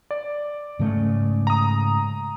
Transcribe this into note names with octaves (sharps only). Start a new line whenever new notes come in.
D5
G#2 C#3 A3
A#5 D#6